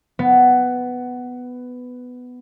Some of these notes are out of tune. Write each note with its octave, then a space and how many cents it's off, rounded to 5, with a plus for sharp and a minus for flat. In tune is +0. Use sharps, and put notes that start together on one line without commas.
B3 +10